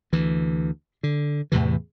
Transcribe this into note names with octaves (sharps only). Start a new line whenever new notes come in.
D2 E3
D3
E2 A2 C3 E3